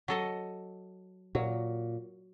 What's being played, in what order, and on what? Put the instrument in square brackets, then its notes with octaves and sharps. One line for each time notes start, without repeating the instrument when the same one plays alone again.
[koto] F#3 A4 D#5
[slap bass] A#2 [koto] F#3